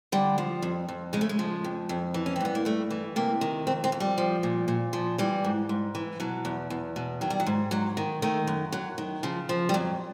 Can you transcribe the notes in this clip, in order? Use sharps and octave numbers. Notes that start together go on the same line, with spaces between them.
D3 G3
F3
F2
F2
C#3 G#3
A3
G#3
F3
F2
F2
E3
C#4
C4
G2 B3
A#3
G2 A3
E3
C3 A#3
D#3
F2 C4
C4
F2
G3
F3
A#2
A#2
F3
E3 G3
G#2
G#2
E3
B2 F#3
E2
E2
B2
D#3 F#3
G3
F#3
G#2
G#2 F#3
D#3
D#3 A3
F#2
F#2 F#3
D#3
C#3 F3
F3
G3
F2 F#3